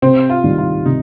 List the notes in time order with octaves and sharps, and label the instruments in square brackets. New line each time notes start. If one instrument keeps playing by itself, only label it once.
[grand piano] C3 [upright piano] C4
[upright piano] F4
[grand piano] D#3 G3
[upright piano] F4
[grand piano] C3 [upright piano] D#4